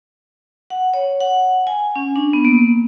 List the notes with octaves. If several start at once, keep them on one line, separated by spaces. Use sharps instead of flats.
F#5
C#5
F#5
G#5
C#4
D4
B3
A#3